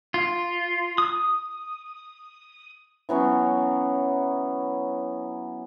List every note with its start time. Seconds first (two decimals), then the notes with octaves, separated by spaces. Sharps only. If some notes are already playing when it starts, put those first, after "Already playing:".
0.14 F4
0.98 D#6
3.09 E3 F#3 B3 C#4